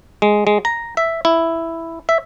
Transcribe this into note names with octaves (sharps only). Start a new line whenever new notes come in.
G#3
G#3
A#5
E5
E4
E5